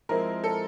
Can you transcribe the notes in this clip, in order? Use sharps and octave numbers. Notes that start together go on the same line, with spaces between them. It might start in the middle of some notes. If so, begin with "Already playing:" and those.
F3 G#3 C4 E4 A#4
A4